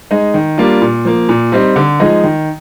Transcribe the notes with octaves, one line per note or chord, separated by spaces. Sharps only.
G#3 D#4
D#3
G3 A#3 D4 F4
A#2
F3 A#3
A#2
G3 C4 D#4
D3
F3 G#3 D#4
D#3